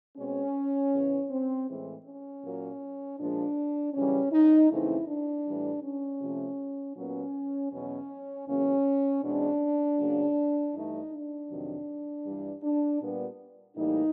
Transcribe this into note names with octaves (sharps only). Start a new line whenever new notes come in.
B2 G#3 C4 C#4
E2 C#3 E3
C4
A2 E3 G#3 C4
C#4
A#2 F#3 A#3
A#2 F3 G#3 D4
F#2 C#3 E3 G3 C#4
D#4
F2 C#3 E3 A3 C4 E4
D4
A2 E3 G3
C#4
C3 F3 A3
A#2 F#3 B3 C#4
E2 B2 F#3 C#4
E2 C#3 F#3 A#3 C#4
E2 B2 G#3 C4 D4
C#3 F#3 A#3
G2 E3 A3 D#4
D4
F2 C3 D#3 F#3
G2 E3 G3
D4
A#2 G3 B3
A2 E3 G3 A#3 D#4